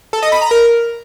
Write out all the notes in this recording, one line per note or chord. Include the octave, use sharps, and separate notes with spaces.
A4
D#5
B5
A#5
A#4